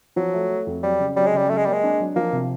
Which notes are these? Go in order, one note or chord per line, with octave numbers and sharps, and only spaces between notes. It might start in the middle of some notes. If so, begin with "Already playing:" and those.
F3 F#3
A3
A3
F2
F#3 G3
C#3
F#3 G3
G#3
C#3 G3
F#3 A3
G#3
G3 A#3
G#3
D4
F#3
F3 A#3
C3